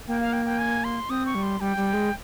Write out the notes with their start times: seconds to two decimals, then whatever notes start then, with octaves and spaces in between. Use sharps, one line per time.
0.08 A#3 G5
0.20 F5
0.33 G5
0.46 G5
0.59 G#5
0.84 C6
1.09 C4 D#6
1.26 C#6
1.35 G3
1.43 C6
1.60 G3 G5
1.77 G3
1.94 G#3